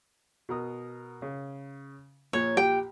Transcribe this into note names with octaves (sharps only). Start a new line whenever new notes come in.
B2 A#4 D#6
C#3
A#1 A#2 C#5
G4 G5